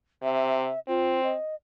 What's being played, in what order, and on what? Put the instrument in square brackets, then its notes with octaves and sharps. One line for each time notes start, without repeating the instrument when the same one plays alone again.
[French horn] C3 [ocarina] E5
[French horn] C4 [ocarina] F4
[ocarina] D#5